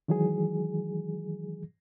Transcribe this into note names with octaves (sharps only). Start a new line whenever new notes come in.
D#3 E3 F#3 G#3 G#4